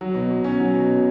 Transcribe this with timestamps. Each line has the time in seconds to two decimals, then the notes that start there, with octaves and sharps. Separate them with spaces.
0.01 F#3
0.15 B2
0.31 B2
0.44 C#4
0.60 F#3
0.74 B2
0.90 B2